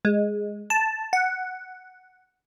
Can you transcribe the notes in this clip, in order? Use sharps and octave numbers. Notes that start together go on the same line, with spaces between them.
G#3
A5
F#5